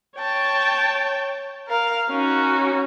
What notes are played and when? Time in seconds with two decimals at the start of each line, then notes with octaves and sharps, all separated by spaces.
0.19 C#5 G5 A5
1.68 A#4 F5
2.11 C#4 D#4 F#4